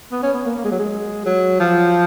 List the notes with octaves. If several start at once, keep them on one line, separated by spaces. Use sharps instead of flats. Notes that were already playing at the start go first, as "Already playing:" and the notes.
B3
C#4
B3
A#3
A#3
G#3
F#3
G#3
F#3
F3